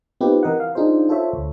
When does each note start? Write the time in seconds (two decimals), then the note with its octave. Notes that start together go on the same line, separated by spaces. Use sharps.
0.20 B3 C4 D#4 F4 G4 B4
0.43 E3 A#4 D#5 F#5
0.60 F5
0.75 D4 D#4 F4 G#4 C5
1.09 F4 A4 C5 C#5 E5
1.33 D2